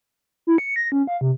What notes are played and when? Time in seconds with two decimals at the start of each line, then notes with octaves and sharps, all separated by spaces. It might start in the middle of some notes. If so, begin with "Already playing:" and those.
0.47 E4
0.58 C#7
0.76 A#6
0.92 C#4
1.07 F5
1.21 C3